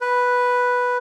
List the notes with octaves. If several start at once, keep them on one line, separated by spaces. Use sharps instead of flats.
B4